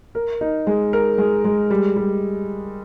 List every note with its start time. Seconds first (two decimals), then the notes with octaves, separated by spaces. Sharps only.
0.15 A#4
0.41 D#4
0.67 G#3
0.93 A#4
1.18 G#3
1.45 G#3
1.71 G3
1.96 G3